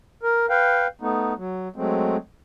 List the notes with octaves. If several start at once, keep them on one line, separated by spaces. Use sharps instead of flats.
A#4
B4 F5 G5
A3 B3 D#4
F#3
F#3 G#3 A3 C4